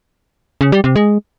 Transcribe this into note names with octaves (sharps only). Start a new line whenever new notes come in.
C#3
G3
C3
G#3